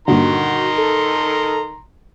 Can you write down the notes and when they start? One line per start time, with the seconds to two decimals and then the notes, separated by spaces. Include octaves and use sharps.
0.08 G2 A#2 D3 D#3 F#4 A#5 C6
0.78 A4